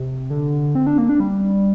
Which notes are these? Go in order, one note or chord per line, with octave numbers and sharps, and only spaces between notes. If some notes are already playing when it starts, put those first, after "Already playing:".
Already playing: C3
D3
C4
D4
A#3
D4
G3